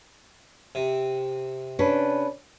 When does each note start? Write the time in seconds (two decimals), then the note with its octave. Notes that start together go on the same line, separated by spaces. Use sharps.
0.75 C3
1.79 C#4 D4 B4